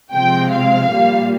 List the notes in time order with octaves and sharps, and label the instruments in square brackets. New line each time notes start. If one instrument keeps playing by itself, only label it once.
[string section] C3 F3 G#3 C4 G5
F5
A#2 G3 A#3